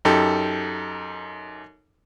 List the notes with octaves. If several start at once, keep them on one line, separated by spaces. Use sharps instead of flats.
F#2 D#4 G4 A4